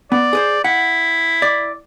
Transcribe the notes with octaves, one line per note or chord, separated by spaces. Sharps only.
B3 D5
G#4 B4 C5
E4 F#5
D5